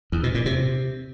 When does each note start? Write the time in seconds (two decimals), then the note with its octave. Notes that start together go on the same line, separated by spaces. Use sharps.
0.12 E2
0.23 B2
0.35 A#2
0.46 C3